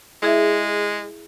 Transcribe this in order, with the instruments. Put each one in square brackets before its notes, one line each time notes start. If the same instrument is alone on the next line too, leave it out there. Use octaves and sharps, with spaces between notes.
[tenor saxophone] G#3 [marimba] E4 G#4 E5